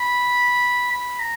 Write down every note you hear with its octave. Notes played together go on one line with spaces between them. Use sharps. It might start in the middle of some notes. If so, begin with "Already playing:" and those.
Already playing: B5
B5
A#5